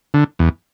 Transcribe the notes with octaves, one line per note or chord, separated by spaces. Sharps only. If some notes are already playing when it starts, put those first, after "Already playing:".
D3
E2